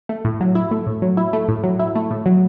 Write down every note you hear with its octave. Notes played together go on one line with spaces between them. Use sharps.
A3
A2
F#3
E4
A3
A2
F#3
E4
A3
A2
F#3
E4
A3
A2
F#3